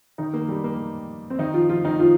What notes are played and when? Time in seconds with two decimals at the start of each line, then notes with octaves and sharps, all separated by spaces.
0.18 D#3 D#4
0.34 A#3
0.48 G3
0.64 A#3
1.30 C4
1.39 D#3 D#4
1.54 F3 F4
1.69 F3 F4
1.84 D#3 D#4
1.99 F3 F4